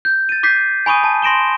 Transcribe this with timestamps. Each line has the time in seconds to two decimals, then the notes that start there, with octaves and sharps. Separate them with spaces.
0.05 G6
0.29 A6 D#7
0.43 D6 G6 B6 C7
0.86 G#5 B5 C#6 D#6 D#7
1.04 A5
1.22 C6 A#6 D7 E7 G7